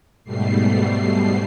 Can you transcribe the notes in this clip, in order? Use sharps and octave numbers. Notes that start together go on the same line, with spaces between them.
G#2 B2 G3 A3 C7